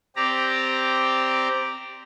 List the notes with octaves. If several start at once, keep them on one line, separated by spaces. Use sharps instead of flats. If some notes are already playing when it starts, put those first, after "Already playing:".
C4 G4 D5 A#5